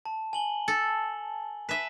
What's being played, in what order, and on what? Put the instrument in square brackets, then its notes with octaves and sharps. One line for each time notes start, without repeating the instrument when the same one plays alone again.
[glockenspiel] A5
G#5 F#7 G7
[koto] A4
[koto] B4 E5 [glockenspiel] B6 E7